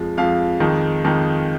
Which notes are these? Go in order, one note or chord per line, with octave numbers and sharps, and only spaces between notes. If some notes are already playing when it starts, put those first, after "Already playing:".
Already playing: F2 F3 G#3
F2 F3 G#3 F5
F2 D#3 G#3 D#4
F2 D#3 G#3 D#4